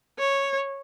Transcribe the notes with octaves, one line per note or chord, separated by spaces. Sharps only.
C#5